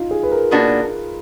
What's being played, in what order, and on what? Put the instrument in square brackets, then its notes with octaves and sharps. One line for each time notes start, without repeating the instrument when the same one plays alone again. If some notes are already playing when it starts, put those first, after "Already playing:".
Already playing: [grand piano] D#4 F4
G#4
B4
A#4
[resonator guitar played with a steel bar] B2 A#3 D4 F#4